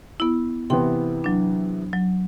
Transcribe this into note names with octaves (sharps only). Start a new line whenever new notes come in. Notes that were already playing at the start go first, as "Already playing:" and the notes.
B3 E4
C3 E3 B3 G5 C6
F#3 D4
F#3